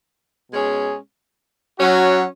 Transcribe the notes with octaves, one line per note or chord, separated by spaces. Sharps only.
B2 G#3 C#4 G#4
F#3 C#4 F#4